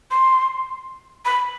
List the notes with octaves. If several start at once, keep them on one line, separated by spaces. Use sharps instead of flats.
C6
B5